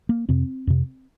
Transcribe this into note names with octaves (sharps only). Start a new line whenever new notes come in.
A#3
F2 C3 C4
F2 C3